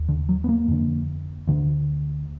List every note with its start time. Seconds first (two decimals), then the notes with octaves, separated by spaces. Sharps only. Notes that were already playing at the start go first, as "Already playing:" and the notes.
Already playing: D#2
0.09 D3
0.29 F#3
0.44 B3
0.49 A#3
0.68 F2 D3
1.47 D2 D3